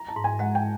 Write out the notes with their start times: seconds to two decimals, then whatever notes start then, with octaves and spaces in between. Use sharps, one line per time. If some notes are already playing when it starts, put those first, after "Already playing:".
Already playing: A#5
0.08 A5
0.16 G#2
0.24 G#5
0.39 G#3 F#5
0.55 G5